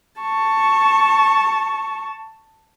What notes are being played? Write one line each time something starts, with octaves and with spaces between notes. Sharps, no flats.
A5 C#6